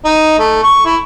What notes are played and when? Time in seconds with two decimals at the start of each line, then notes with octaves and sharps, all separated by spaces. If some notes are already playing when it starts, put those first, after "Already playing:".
0.04 D#4
0.39 A3
0.63 C#6
0.85 E4